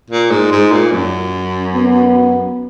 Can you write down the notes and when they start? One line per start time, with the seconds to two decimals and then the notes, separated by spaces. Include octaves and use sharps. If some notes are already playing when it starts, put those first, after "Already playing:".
0.10 A#2
0.30 G#2
0.51 G#2
0.71 A#2
0.92 F#2
1.75 B3